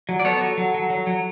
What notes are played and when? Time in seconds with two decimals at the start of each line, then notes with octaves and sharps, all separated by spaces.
0.09 F#3
0.20 D5
0.24 B3 A4 C#5
0.41 F#3
0.57 F#3
0.74 F#3
0.90 F#3
1.07 F#3